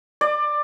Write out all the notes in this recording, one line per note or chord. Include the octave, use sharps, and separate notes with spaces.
D5